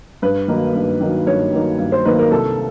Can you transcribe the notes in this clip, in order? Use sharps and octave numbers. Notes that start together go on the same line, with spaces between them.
G2 B4
D#3 F#3 A#3 D#4
G2
D#3 F#3 A#3 D#4
G2 C#5
D#3 F#3 A#3 D#4
G2
C5
D#3 F#3 A#3 D#4 B4
A#4
C2 A4